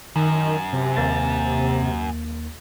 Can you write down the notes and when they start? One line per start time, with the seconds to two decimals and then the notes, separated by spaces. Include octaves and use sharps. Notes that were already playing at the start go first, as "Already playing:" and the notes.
0.16 F#2 D#3
0.73 C3
0.97 D#2 A#3 A6